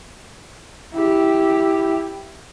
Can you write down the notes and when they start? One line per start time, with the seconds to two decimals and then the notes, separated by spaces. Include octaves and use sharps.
0.92 E4 G4